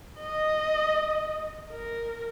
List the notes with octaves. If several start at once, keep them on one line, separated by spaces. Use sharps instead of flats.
D#5
A#4